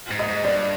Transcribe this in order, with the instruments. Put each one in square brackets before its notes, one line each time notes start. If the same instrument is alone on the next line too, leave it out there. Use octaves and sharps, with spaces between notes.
[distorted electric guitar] G#2
[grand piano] D#5
[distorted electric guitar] G#2
[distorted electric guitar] G2 [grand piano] D5